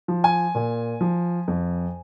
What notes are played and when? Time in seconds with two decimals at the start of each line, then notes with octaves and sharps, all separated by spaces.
0.08 F3
0.24 G#5
0.55 A#2
1.01 F3
1.48 F2